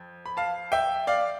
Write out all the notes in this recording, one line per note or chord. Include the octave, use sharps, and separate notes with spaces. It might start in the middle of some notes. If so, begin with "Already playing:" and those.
Already playing: F2
B5
F5 A5
E5 G5
D5 F5